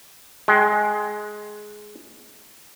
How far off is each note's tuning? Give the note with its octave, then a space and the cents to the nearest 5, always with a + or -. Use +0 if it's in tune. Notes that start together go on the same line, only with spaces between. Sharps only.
G#3 +15 G5 +0